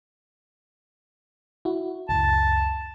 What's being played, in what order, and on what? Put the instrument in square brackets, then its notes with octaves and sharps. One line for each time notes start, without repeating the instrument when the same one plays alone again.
[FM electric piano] E4 F#4
[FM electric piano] C#2 F#2 [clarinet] A5